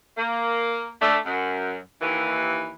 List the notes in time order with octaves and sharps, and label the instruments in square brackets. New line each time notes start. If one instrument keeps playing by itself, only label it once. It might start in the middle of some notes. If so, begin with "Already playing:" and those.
[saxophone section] A#3
A3 D4
F#2
D#2 E3